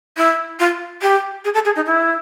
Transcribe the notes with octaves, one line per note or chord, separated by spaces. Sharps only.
E4
F4
G4
G#4
A4
G#4
D#4
E4